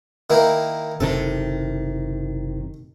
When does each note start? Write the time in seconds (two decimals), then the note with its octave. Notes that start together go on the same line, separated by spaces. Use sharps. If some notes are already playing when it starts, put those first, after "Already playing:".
0.30 D#3 A#3 E4
1.00 F#1 C3 D#3 A4